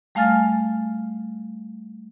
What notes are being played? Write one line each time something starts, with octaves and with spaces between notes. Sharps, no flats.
G3 A3 F5 G#5 F6 A6